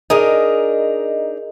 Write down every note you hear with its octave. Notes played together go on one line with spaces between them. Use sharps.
D4 D#4 G#4 A#4 D#5